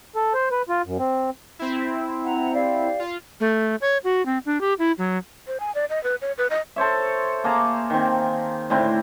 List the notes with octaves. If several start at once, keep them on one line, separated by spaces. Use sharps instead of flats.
A4
C5
B4
F4
F#2
C4
C4 E4
F#5 A#5
G4 D5 F5
F4
A3
C#5
F#4
C4
D4
G4
E4
F#3
C5
G#5
D5
D#5
B4
C#5
B4
D#5
A4 C5 C#5 E5
A#3 G#4 A5 A#5
D#3 C4
A2 D3 C4 E4